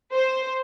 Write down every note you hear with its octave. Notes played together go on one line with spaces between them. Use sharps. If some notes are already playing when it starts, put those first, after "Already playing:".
C5